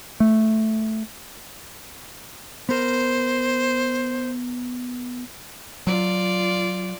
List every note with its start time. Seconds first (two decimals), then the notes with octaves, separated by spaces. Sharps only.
0.20 A3
2.69 B3 A#4 C5
5.87 F#3 F4 D5